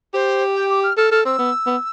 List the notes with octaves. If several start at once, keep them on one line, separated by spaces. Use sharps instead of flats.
G4 C5
G5
D6
F6
A4 F6
A4 F6
C4 E6
B3
B3